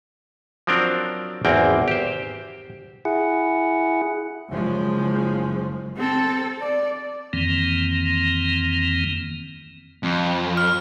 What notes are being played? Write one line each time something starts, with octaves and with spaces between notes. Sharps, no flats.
F3 F#3 C4 D4 A#4
G#1 E2 A#3 C4 G5
G4 C5
E4 G#4 F#5
F#1 C#3 F3 G#3
C4 A4
D5
F2 D#3 E3 A#3 C4
F2
F6